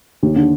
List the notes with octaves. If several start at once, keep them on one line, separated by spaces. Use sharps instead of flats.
D#2
D3